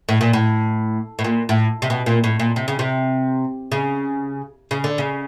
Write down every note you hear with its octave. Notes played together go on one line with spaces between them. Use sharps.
A2
A#2
A2
A2
A#2
A2
C3
B2
A#2
A2
A#2
C3
C#3
C3
C#3
C#3
D3
C#3